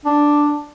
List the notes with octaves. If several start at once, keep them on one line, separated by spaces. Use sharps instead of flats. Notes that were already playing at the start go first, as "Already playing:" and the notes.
D4